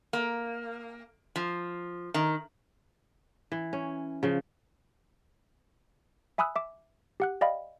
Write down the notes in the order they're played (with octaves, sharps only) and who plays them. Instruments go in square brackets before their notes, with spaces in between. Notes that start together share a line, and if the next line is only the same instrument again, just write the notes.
[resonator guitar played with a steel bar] A#3
F3
D#3
[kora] E3
C#4
C#3 F3
[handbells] E5 G#5 B5 D#6 E6 F#6
E5 D6
G4 F#5 F#6
D5 D#5 F5 G5 B5